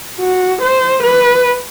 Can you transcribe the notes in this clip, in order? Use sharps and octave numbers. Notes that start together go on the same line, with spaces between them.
F#4
C5
B4